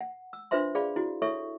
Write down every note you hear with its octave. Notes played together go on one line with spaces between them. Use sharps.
F#5
E6
D4 F4 B4 C5 E5 C6
G#4 D5 F5 B5
E4 F#4
E4 A4 C#5 E5 C#6